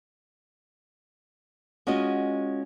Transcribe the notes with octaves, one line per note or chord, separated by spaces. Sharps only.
G#3 C#4 F4 F#4 D#5